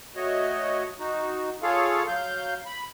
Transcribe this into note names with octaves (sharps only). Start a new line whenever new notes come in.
A3 F#4 C#5 D#5
D#4 F#4
F4 G#4 A4 C#5 F5
F#3 F5 G6
B5